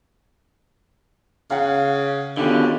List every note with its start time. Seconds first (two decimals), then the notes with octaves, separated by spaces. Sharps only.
1.50 C#3 F5 F#5
2.37 B2 D3 D#3 C#4 F4 G4